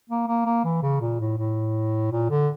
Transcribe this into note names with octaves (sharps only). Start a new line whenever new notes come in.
A#3
A#3
A#3
E3
C#3
A#2
A2
A2
A#2
D3